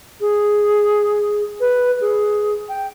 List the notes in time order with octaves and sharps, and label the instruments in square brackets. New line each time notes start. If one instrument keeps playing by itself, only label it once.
[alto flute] G#4
B4
G#4
G5